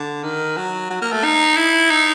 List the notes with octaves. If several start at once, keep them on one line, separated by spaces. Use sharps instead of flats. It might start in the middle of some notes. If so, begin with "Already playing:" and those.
Already playing: D3
D#3
F#3
F#3
A#3
A3
D#4
E4
D#4